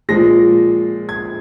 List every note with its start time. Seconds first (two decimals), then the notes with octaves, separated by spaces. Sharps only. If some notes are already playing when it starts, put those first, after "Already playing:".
0.09 A#2 F3 G#3 A#6
1.09 G#6